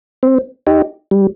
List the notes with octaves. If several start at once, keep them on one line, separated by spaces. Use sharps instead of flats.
C4
D#4 G4
G3